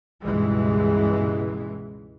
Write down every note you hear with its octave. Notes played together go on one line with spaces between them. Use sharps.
C#2 G2 B2 E3 G#3